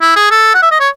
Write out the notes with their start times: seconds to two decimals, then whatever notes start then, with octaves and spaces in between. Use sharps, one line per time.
0.02 E4
0.16 G#4
0.31 A4
0.55 F#5
0.63 E5
0.71 D#5
0.80 C#5